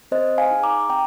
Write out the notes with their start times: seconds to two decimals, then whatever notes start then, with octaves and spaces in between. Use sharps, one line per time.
0.11 C4 C5 D#5
0.38 F5 G#5
0.51 D#4 G#4
0.63 A#5 D6
0.89 C4 G5 A#5